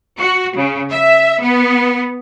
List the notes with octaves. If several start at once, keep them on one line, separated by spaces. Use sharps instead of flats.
F#4
C#3
E5
B3